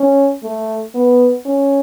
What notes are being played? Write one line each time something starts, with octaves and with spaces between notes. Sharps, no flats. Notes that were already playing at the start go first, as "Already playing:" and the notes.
Already playing: C#4
A3
B3
C#4